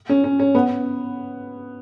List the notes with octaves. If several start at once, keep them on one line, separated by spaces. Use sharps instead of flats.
C#4
C#4
C#4
B3